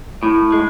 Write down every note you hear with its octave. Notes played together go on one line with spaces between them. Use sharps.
A2
G#3